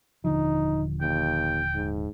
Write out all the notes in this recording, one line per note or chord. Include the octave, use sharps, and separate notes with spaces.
D#1 D3 F3 D#4
D#2 G5
G#2